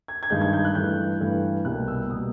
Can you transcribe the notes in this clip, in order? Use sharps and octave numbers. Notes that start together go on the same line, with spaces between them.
G#6
G#6
G2 D#3 G#3 G6
G#6
G6
F#6
G2 E3 A3 G6
G2 E3 A3
C2 B2 G3 A#3 F#6
E6
B2 G3 A#3 D#6